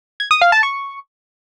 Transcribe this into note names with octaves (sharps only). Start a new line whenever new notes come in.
G#6
D#6
F5
A5
C#6